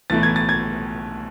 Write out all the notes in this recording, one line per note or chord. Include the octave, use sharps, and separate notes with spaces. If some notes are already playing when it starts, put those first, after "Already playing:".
B1 A2 E3 A3 E4 A6
G#6
A6
G#6